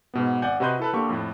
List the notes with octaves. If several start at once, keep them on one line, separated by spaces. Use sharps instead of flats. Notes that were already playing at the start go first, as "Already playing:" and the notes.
G#2 B2 B3
G#1 D5 F#5 G#5 G6
C3 F#4 B4 D#5 C6 G6
E4 A4 B4
D3 A#3 G4 A4 C#6
F2 A2